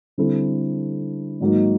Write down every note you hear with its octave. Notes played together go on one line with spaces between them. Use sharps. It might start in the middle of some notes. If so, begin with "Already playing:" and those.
D3 G3 C4 E4 A4
G#2 D#3 F#3 A#3